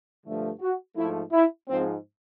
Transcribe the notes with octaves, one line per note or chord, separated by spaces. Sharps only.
G2 D3 F3 A3
F#4
G#2 F3 A3 E4
E4
G#2 F3 G#3 C4